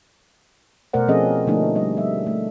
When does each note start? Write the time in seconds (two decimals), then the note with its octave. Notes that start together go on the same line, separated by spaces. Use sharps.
0.93 B2 A3 A#4 C5 D5 F#5
1.08 F3 C4 C#4 G#4 A4 D#5
1.47 D3 F3 A3 A#3 D4 D#4
1.76 G3 D#5
1.97 G3 E5
2.26 A3